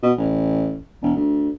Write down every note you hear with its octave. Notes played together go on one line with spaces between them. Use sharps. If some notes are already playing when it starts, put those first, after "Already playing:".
B2
A1
E1
D2